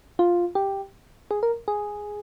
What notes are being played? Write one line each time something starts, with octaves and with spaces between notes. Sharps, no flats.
F4
G4
G#4
A#4
G#4